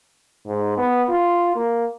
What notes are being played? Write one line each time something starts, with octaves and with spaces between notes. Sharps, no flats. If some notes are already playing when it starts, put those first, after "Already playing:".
G#2
B3
F4
A#3